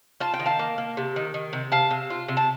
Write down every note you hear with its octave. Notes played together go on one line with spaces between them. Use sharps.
F4 A5
G5
D#3
F5 A5
A#3
A#3
C3
D#3
D#3
C3
C3 F5 A5
C3
F4
C3
A5